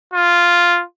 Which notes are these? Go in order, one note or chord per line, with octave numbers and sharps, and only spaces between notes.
F4